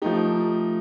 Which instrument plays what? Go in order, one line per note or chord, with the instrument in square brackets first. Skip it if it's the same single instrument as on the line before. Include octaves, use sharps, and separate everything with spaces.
[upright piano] F3 A3 D#4 G4